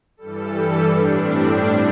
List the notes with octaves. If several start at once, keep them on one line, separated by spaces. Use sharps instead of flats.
G2 E3 G3 A4
A2 G3 D4
C4
A2 G3 D4